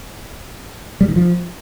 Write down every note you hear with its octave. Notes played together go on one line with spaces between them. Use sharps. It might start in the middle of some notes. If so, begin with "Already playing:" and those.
G3
D#3
F3